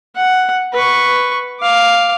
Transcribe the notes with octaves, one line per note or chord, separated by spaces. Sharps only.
F#5
B4 C#6
F5 D6